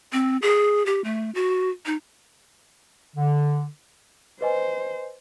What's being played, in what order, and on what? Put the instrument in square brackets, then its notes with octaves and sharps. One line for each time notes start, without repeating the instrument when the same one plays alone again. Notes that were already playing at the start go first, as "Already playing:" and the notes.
[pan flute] C4
G#4
G4
A3
F#4
D#4
[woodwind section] D3
[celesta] B4 D#5 G#5 [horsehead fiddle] C5